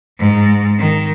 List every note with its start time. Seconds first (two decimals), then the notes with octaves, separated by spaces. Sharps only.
0.18 G#2
0.78 D#3